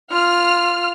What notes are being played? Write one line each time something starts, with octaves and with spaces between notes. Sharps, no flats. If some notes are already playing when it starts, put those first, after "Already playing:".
F4 F6